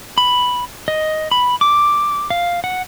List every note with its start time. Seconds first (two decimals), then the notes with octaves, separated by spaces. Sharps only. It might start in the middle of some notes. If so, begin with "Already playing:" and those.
0.18 B5
0.88 D#5
1.31 B5
1.61 D6
2.30 F5
2.64 F#5